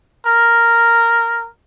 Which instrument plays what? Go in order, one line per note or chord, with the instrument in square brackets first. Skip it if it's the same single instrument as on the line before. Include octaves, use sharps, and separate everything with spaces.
[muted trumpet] A#4